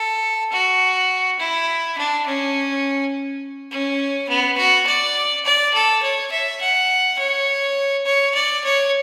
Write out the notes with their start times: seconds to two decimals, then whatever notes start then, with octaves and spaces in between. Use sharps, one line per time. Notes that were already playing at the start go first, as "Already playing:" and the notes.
Already playing: A4
0.52 F#4
1.39 E4
1.98 D4
2.26 C#4
3.71 C#4
4.29 B3
4.58 F#4
4.87 D5
5.45 D5
5.74 A4
6.03 C#5
6.31 E5
6.61 F#5
7.18 C#5
8.05 C#5
8.35 D5
8.64 C#5